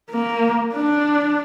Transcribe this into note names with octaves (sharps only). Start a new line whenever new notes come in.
A#3
D4